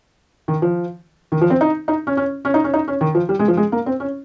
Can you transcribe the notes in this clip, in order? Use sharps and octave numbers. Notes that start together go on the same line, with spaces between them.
D#3
F3
D#3
F3
C4
D#4
D#4
C#4
C#4
C#4
D#4
C#4
D#4
C#4
D#3
F3
G3
G#3
F3
G#3
A#3
C4
C#4